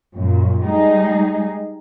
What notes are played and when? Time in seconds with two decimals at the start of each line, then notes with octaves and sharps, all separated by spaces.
0.16 F#2 A#2
0.64 G3 G#3 D#4 G#4